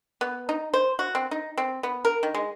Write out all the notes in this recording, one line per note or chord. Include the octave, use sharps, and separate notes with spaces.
B3
D#4
C5
F#4
C4
D#4
C4
B3
A#4
D#3
G#3